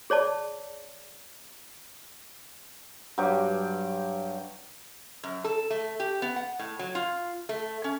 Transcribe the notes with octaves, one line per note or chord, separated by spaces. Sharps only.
G#4 C#5 D5 A5
G2 F#3 G4
F#2
A4
A3
G4
B3
F#5
A2
F#3
F4
A3
C#4